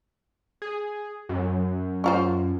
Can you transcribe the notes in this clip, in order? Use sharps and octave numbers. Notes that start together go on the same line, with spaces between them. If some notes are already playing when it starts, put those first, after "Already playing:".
G#4
F#2
C#4 F4 C5